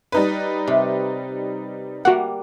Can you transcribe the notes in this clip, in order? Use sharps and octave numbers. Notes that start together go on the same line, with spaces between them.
G3 D#4 B4
C3
G3 A#3 F#4 F#5